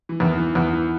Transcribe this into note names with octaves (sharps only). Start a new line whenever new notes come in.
E3
E2 D#3
E3
E2
E3